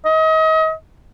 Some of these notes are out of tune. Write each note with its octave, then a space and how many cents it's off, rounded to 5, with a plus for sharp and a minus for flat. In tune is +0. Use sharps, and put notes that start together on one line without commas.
D#5 +35